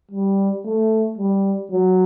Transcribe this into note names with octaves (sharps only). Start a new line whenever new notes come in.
G3
A3
G3
F#3